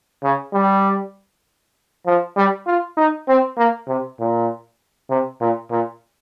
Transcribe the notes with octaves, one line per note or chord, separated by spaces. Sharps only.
C#3
G3
F3
G3
F4
D#4
C4
A#3
C3
A#2
C3
A#2
A#2